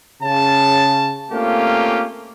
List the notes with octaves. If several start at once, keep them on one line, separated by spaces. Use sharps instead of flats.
C#3 A5
A3 A#3 C4 C#4 F4 G4